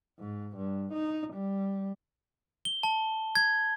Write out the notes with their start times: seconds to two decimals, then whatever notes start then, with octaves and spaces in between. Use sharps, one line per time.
0.19 G#2
0.57 G2
0.93 D#4
1.33 G3
2.65 G7
2.83 A5
3.35 G#6